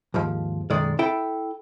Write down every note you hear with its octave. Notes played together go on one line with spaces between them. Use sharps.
D#2 G#2 F3
B1 F#2 D#3 G#3 D5
E4 A4 G5